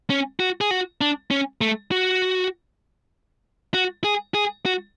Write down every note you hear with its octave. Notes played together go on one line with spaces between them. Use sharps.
C#4
F#4
G#4
F#4
D4
C#4
A3
F#4
F#4
G#4
G#4
F#4